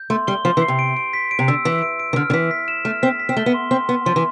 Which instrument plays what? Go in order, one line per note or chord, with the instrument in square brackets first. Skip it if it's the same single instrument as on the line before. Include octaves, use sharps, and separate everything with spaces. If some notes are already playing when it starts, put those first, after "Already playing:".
Already playing: [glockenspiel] G6
[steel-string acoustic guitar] A3 [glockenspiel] C6
[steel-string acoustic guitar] G3 [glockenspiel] G7
[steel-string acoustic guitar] F3 [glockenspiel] C6
[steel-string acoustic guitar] E3
[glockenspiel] C7
[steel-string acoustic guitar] C3
[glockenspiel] D7
D7
B6
D7
[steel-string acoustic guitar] C3
[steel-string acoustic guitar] D3 [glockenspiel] E6
[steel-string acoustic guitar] E3 [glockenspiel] E6
[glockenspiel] D7
D7
[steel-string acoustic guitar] E3
[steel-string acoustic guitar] D3 [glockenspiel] F6
[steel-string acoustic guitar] D3
[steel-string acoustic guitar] E3 [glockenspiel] B6
[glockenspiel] B6
E7
[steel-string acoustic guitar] A3 [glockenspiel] F6
[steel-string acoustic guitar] C4 [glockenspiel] B6
[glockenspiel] B6
[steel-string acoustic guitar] C4
[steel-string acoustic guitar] A3 [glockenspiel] G7
[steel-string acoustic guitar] B3
[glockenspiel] C6
[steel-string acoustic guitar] C4 [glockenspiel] C6
[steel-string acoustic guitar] B3 [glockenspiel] C6
[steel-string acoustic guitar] F3 [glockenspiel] C6
[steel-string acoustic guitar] E3